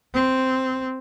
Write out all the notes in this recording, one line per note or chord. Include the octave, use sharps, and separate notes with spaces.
C4